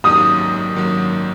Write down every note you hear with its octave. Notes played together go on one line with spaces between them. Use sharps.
G#1 F#2 D#3 F#3 A#3 D#6
G#1 F#2 D#3 F#3 A#3